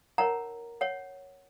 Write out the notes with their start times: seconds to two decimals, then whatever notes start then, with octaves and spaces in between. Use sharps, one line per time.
0.18 D#4 A#4 C#5 F#5 A#5
0.81 C#5 F#5